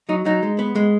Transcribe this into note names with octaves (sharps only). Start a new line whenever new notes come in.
F#3 D#4
F#3 D#4
G#3
B3
G#3